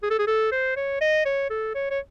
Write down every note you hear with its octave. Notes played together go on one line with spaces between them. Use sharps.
G#4
A4
G#4
A4
C5
C#5
D#5
C#5
A4
C#5
C#5